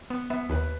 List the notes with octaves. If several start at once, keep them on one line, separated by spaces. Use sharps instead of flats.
B3
B3 E5
D#2 B4